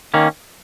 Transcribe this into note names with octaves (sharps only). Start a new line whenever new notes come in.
D#3 A#3 C#4